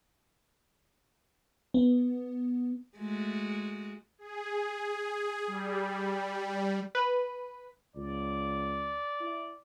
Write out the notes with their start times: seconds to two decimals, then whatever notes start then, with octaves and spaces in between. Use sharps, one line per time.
1.74 B3
2.97 G#3 A3 F#4
4.19 G#4
5.47 G3
6.95 B4
7.96 C#2 D5
9.20 E4